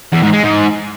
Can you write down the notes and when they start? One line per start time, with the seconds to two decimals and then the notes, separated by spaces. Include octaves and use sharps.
0.12 E2
0.23 G#2
0.33 G#3
0.43 G#2